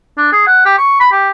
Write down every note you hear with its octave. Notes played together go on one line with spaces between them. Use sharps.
D4
G#4
F#5
G4
C#6
B5
G4